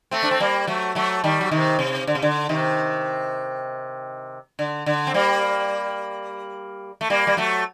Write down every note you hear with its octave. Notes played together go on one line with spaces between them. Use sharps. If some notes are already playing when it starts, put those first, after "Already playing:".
A3 C4
D4
C4
G3 A#3
F#3 A3
F#3 A3
D#3 G3
F#3
C3 D#3
C3
D3
C3
D3
C3 D#3
D3
D3
C4
G3 A#3
A3
G3 A#3
G3
F#3 A3